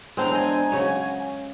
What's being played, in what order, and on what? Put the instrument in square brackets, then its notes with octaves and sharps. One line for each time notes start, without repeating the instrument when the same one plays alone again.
[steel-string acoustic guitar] E2 D4 A#5 [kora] G#3 C4
[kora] C4 D#5 [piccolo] G#5
[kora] C#3 C#5 [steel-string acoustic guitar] F#3 F#4